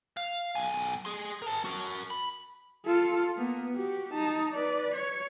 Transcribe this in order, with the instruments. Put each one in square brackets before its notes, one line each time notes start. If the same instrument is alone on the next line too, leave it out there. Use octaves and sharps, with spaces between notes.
[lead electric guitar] F5
B1 G#5
G#4 C6
A#4 A5
F#4 A#4
B5
[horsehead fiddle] F4 A4
A#3 B3
F#4 G4
D#4 A5
B4 D5
C#5